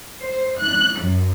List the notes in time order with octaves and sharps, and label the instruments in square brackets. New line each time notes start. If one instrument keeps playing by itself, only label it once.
[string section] C5
F#6
F#2